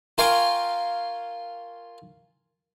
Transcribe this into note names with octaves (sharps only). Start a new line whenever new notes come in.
F4 A#4 F5 G5 G#5 C#6